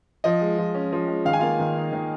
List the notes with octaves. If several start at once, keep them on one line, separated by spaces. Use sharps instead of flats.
F3 D#5
G#3
F3
C#4
F3
G#3
D#3 F5
G#5
A#3 F4 F5
D#3
D#4
D#3